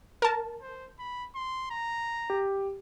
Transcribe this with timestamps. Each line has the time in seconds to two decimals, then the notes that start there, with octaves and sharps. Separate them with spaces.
0.22 A#4 A5
0.62 C5
0.99 B5
1.35 C6
1.71 A#5
2.30 G4